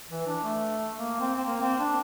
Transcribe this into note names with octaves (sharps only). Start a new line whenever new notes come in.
E3
D4
A3
A#3
C4
C4
A#3
C4
D4